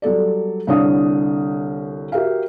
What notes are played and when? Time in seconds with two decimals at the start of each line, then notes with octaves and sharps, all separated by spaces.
0.02 F#3 G3 A4 D5
0.67 C2 D3 D4 C#5 F5 D#6
2.12 F#4 G4 A#4 E5 F5